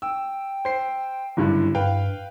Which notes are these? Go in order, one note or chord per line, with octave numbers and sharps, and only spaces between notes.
G5 E6
C5 C7
F#1 G2 D3 E4
G2 B4 F5 G5